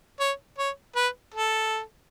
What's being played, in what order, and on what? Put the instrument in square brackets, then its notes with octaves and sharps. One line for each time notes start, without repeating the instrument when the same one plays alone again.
[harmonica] C#5
C#5
B4
A4